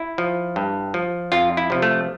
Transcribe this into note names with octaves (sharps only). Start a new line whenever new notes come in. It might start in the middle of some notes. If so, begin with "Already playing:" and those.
Already playing: E4
F3
G2
F3
F2 F4
E4
C3 F3
A3